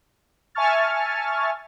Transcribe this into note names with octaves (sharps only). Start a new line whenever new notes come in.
E5 G#5 A5 C#6 F6 A6